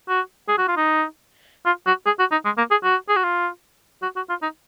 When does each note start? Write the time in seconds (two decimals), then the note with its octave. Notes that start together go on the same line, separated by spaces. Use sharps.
0.08 F#4
0.48 G#4
0.58 F#4
0.68 F4
0.77 D#4
1.66 F4
1.86 F#4
2.06 G#4
2.19 F#4
2.32 D#4
2.45 G#3
2.58 A#3
2.71 G#4
2.84 F#4
3.09 G#4
3.16 F#4
3.24 F4
4.02 F#4
4.16 F#4
4.29 F4
4.42 D#4